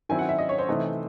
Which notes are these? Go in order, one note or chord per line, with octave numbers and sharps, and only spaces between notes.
D#3 F#3 C4 E4 G#5
F#5
E5
D#5
C#5
C5
C3 E3 A3 D#4